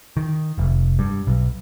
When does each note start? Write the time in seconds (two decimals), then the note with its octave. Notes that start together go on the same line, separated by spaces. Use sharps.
0.17 D#3
0.58 F1
0.99 G2
1.27 B1